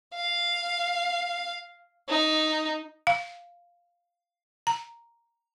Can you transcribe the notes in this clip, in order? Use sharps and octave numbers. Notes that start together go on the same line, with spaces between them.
F5
D#4
F5
A#5